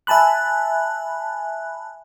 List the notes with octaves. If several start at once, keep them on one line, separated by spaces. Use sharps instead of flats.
E5 G#5 A5 B5 F#6